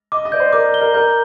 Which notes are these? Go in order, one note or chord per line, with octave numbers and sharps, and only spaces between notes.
D#5 D6
D#5
D5 G6
C5
A#4 D6
G7
A#4
A#4 G6